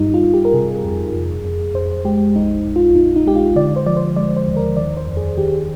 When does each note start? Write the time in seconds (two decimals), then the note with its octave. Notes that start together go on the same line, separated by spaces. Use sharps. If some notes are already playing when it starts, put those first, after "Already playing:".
Already playing: G2 G3 D#4
0.14 F4
0.24 G3
0.34 G4
0.45 A#4
0.54 C3 G#4
0.84 F2
1.14 F2
1.45 F2
1.74 F2 C5
2.05 G#3 G4
2.35 A#1 D#4
2.65 A#1
2.76 F4
2.95 A#1 D#4
3.16 D#4
3.26 G#3 G4
3.36 F4
3.56 D3 D5
3.76 C5
3.86 F3 D5
3.97 C5
4.16 G#3 D5
4.37 C5
4.47 D#2
4.57 A#4
4.77 D#3 D5
4.97 C5
5.07 F2
5.17 G#4
5.37 D#3 G4